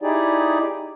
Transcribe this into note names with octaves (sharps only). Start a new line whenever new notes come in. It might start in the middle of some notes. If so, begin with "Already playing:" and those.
D#4 E4 G4 G#4 D5